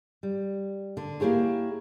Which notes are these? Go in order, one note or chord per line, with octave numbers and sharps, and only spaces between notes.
G3
D3
A#3 E4 G4 G#4 C#5